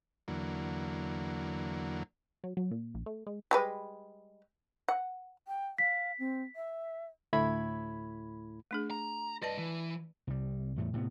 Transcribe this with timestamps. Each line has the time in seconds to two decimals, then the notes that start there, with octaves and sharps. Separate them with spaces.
0.28 E2 D3 F#3 A#3
2.44 F#3
2.57 F#3
2.71 A#2
2.95 A#1
3.06 A3
3.27 G#3
3.51 G3 G#3 B4
4.89 F#5
5.48 G5
5.78 F5 B6
6.19 C4
6.56 E5
7.33 D2 A2 A3 E4 B5 G#6
8.71 A3 D4 G#4
8.90 A#5
9.42 G2 B4 D5 D#5 A5
9.59 E3
10.27 C2 G3
10.78 E2 A2 A3
10.93 A2 C3 A#3 B3